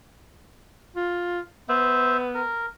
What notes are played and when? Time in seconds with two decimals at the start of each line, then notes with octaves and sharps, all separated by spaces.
0.96 F4
1.69 B3 C5 E5
2.35 A#4